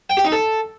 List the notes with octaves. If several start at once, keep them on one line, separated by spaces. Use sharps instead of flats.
G5
G4
D#4
A4